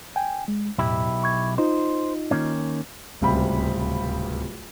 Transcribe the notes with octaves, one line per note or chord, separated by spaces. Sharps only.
G5 G#5
G#3
B1 E2 A2 E4 G4
C#6 G#6
D#4 F4 C5 D#5
D#3 A#3 C#4
D1 C#2 C3 G3 B5